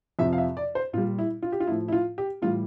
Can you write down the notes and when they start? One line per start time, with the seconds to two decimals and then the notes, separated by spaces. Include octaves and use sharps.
0.19 F2 C3 F3 E5
0.33 F5
0.38 E5
0.57 D5
0.75 C5
0.93 A#2 F4
0.98 G3
1.18 E4
1.42 F4
1.52 G4
1.60 F4
1.67 A2 F3 E4
1.88 E4
1.92 F4
2.18 G4
2.42 A2 E3 G3 F4